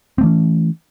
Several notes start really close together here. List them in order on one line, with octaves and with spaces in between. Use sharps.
C4 A3 E3 C#4